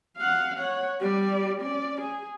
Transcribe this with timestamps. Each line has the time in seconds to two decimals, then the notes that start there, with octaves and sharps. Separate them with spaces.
0.17 F5 F#5
0.58 C#5 F#5
1.00 G3 D5
1.61 C#4 D5
2.01 G#4